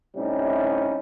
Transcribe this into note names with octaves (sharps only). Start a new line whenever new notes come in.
A2 C3 G3 C#4 D#4